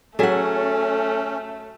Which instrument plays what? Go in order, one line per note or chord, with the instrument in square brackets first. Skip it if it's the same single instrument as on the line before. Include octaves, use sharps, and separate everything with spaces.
[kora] F#3 G#4 E5 [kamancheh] A3 [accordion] C#4 [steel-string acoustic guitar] A4 F#5